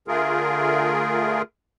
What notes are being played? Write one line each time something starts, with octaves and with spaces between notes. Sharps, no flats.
D3 A3 F4 G#4 A#4